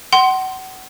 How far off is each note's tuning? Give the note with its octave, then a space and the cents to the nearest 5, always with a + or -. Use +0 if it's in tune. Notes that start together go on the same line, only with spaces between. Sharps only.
F#5 +30 C6 +0